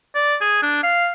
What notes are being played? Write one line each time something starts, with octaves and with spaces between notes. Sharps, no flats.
D5
G#4
D4
F5